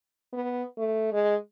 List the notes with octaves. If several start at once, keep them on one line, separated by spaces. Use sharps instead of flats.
B3
A3
G#3